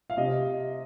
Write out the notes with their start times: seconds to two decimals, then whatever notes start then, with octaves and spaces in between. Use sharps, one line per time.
0.10 F5
0.17 C3 D#5